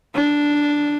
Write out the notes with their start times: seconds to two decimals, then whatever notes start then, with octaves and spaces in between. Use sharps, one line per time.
0.15 D4